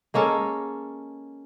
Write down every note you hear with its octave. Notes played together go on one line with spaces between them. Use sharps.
G#3 A#3 C#4 A4